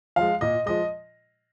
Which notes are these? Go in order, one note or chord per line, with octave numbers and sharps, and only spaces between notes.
F3 G#3 F5
A#2 D#5
F3 G#3 D#5